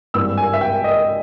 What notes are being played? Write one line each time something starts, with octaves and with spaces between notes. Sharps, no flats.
G#1 G2 E3 G3 E6
G#5
E5
G5
D#5